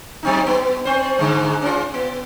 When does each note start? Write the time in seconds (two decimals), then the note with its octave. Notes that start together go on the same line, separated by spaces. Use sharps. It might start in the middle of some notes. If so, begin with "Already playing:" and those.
0.23 F#3 C4 D#4
0.47 B3
0.85 C4 C5
1.19 G#2 D3 G#3
1.62 C#4 F4
1.94 B3